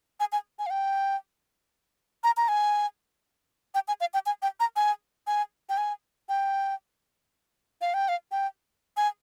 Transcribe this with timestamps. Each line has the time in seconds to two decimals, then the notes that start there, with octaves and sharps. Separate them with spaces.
0.20 G#5
0.32 G#5
0.59 G#5
0.66 F5
0.70 G5
2.24 A#5
2.37 A#5
2.48 G#5
3.75 G5
3.88 G#5
4.01 F5
4.14 G5
4.26 G#5
4.42 G5
4.60 A#5
4.76 G#5
5.27 G#5
5.69 G5
5.78 G#5
6.29 G5
7.81 F5
7.94 G5
8.09 F5
8.32 G5
8.97 G#5